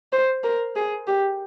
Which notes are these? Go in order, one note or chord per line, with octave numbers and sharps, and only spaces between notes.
C5
A#4
G#4
G4